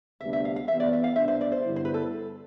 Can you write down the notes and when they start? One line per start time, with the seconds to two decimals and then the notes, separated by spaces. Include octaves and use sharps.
0.21 D2 C3 G3 B3 D4 E5
0.33 E5
0.45 F5
0.56 F5
0.68 E3 G3 B3 D4 E5
0.80 D5
0.93 E5
1.04 F5
1.16 C2 B2 B3 D4 E5
1.28 C5
1.41 D5
1.52 C5
1.64 G2 D3 G3 B3 E4
1.76 C5
1.85 B4
1.94 A4